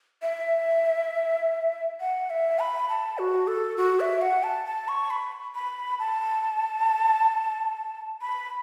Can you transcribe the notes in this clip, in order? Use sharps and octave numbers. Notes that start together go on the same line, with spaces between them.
E5
F#5
E5
B5
A5
F#4
A4
F#4
E5
F#5
A5
A5
C#6
B5
B5
A5
B5